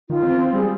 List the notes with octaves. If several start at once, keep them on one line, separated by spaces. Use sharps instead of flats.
D#3 F4
C4
C4
G3 G#4